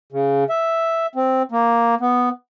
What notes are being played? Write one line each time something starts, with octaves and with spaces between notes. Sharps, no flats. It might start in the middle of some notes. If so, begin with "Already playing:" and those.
C#3
E5
C4
A#3
B3